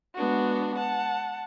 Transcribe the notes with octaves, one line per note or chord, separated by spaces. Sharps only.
G#3 B3 D4 F#4
F#5 A5